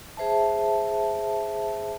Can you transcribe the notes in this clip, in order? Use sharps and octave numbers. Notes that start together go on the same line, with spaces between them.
G#4 C5 E5 A5